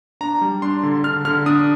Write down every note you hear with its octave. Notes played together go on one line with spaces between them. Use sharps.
D4 A#5
G3
D4 C6
D3
D3 F6
D3 F6
D4 D#6